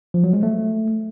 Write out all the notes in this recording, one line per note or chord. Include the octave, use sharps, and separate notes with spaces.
F3
F#3
G#3
A3